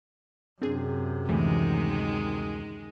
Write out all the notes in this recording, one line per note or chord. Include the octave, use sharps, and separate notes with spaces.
F#2 C3 C4 D4 G#4
D2 D#3 E3 G#3 A3